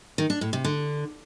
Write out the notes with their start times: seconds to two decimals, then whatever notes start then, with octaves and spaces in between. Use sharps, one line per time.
0.18 D#3
0.30 D4
0.41 A2
0.53 C3
0.64 D3